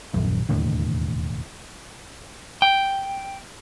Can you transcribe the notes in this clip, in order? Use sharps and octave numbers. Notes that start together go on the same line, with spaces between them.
D#1 A#1 F#2
E1 D#2 A2 D3
G5